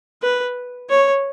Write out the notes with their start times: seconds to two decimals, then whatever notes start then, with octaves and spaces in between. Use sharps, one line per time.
0.22 B4
0.90 C#5